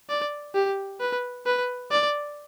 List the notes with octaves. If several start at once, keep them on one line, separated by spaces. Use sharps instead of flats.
D5
G4
B4
B4
D5